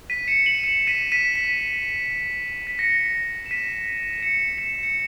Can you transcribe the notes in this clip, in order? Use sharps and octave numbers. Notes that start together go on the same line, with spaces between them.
B6 D#7
C#7 E7
D#7 F#7
C#7 E7
B6 D#7
B6 D#7
B6
B6
A#6 C#7
E7
B6 D#7
C#7 E7
C#7 E7
C#7